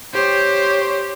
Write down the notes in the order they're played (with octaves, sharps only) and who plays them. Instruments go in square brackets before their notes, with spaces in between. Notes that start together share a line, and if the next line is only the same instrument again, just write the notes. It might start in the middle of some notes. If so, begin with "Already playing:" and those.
[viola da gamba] G4 [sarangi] C5 [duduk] C#5